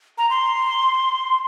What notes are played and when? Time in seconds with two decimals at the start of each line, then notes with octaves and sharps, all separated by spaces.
0.18 A#5
0.30 C6